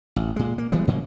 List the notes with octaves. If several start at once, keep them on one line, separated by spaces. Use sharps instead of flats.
A1
A#2 G#3
A#3
E3 G3 G#3 B3
G#2 C#3 F#3 A#3